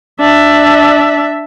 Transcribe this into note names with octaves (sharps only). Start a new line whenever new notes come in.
D4 E5